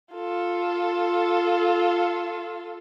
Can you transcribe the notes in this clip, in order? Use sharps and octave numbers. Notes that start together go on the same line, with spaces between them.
F4 A4